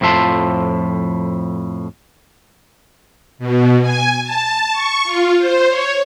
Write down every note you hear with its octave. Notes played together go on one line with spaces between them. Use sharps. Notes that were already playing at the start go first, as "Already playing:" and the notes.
F2 A2 F3 E5 A5 C6
B2
G#5
A5
C#6
F4
C5
C#5